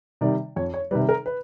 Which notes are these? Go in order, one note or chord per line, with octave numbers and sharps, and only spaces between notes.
C3 D#3 G3 D5
F2 C#5
C#5
C3 D#3 G3 B4
A#4
B4